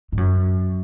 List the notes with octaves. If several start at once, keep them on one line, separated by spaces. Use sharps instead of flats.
G#2
F#2